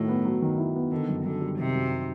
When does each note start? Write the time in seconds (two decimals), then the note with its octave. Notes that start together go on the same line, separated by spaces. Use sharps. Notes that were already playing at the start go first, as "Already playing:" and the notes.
Already playing: A2 D#3 F#3 E4
0.08 B3
0.25 F#3
0.42 D#3
0.58 E4
0.76 B3
0.92 D3 D#3
1.09 F#2
1.24 F#2 D3
1.41 G3
1.58 C3 D#3
1.74 F#2